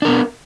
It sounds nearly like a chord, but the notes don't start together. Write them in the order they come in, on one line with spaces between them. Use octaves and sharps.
D4 A#4 B3